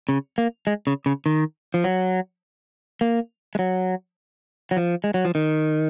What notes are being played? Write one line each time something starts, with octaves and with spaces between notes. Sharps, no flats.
C#3
A#3
G#3
C#3
C#3
D#3
F3
F#3
A#3
G#3
F#3
F#3
F3
G#3
F#3
F3
D#3